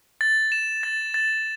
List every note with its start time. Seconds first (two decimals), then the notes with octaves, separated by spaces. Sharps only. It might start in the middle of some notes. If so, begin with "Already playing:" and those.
0.21 A6
0.52 E7
0.83 A6
1.14 A6